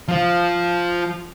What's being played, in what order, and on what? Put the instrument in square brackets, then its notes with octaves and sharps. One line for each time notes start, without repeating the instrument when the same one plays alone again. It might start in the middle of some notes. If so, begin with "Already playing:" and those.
[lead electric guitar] F3 F4